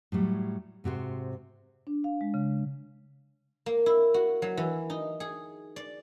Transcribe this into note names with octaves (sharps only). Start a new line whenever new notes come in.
A2 F#3 G3
G#2 C3 F#4 C5
D4
F5
G#3
C#3
A#3
E4
F#4
F#3
E3
D#4
G#4
D5